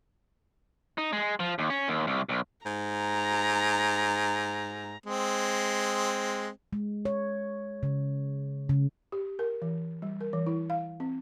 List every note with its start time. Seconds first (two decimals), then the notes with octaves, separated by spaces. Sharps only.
0.98 D#4
1.13 G#3
1.40 F3
1.58 D#2
1.70 C#4
1.88 D#2
2.07 C2
2.29 B1
2.66 G#2 A#5
5.06 G#3 C4
6.73 G#3
7.05 C#5
7.83 C#3
8.69 C#3
9.12 G4
9.39 A#4
9.62 E3
10.02 G3
10.21 A#4
10.33 E3
10.47 E4
10.70 F5
11.00 C4